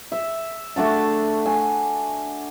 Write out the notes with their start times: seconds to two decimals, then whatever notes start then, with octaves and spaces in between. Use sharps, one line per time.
0.12 E5
0.76 A3 D4 F#4 A5
1.46 G#5